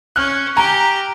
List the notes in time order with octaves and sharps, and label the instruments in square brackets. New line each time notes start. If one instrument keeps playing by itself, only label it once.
[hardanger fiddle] C#4 [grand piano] F6 F#6
[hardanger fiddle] G4 [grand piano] G#5 A#5